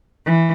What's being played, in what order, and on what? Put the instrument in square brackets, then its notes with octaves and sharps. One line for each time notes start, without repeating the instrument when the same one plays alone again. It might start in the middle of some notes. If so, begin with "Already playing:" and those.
[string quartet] E3